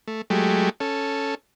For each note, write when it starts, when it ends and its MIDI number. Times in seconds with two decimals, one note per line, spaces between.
0.08 0.22 57
0.30 0.70 54
0.30 0.70 56
0.30 0.70 57
0.30 0.70 67
0.80 1.35 61
0.80 1.35 69